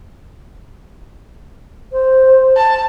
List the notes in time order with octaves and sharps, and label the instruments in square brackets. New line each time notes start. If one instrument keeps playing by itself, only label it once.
[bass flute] C5
[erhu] A5